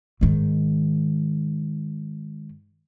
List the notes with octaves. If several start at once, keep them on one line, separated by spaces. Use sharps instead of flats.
G#2 D#3